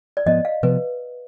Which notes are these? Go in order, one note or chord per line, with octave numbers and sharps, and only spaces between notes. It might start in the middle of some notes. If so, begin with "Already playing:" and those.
D5
G#2 F3 B3 D#5
F5
C3 F3 B3 B4